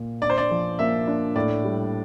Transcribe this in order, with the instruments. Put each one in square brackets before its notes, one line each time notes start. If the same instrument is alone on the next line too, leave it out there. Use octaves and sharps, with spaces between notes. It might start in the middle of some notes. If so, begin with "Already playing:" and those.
Already playing: [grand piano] A#2
[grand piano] D4 [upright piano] D5
[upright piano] C5
D5
[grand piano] F3
[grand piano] A#3 [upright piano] E5
[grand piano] D4
[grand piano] A2 [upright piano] D5
[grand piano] G3